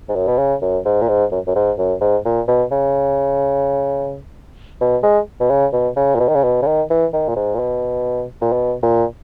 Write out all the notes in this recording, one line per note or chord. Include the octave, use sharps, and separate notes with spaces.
G#2
F#2
B2
C#3
F#2
G#2
A#2
G#2
F#2
F#2
G#2
F#2
G#2
A#2
B2
C#3
B2
G#3
B2
C#3
B2
C#3
A#2
B2
D#3
C#3
B2
C#3
D#3
E3
D#3
A#2
G#2
A#2
B2
A#2
B2
A#2